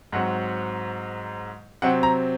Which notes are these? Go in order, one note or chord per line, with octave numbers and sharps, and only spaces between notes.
G#2 F#3 C4 F#5
C3 F#3 C4 F#5
A#5